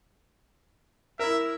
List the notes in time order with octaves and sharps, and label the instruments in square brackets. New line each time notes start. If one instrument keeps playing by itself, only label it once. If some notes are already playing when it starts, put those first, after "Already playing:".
[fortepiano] E4 A#4 [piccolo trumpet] E5